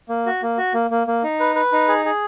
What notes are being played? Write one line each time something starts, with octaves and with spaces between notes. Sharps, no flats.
A#3
F#4
A#3
F#4
A#3
A#3
A#3
D#4
B4
B4
D#4
G#4
G#4